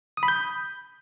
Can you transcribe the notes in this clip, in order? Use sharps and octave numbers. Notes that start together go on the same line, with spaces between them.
D#6
B5
G6